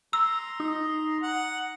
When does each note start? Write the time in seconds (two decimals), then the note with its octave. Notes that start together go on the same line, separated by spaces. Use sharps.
0.13 A#5 C6 E6
0.60 D#4
1.22 F#5